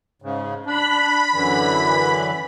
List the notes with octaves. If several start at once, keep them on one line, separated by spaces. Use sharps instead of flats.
G#2 C#3
D4 B5
F#2 D3 E3